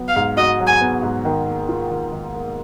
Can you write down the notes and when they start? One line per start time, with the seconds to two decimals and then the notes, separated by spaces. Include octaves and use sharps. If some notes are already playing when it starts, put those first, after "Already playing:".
Already playing: F#3 B3 F#4
0.08 F5
0.16 G#2
0.37 F#4 D#5
0.60 F#3
0.67 G#5
0.81 B3
1.03 G#2
1.25 D#3
1.46 A#3
1.69 F4
1.90 D#3
2.12 D#3
2.35 A#3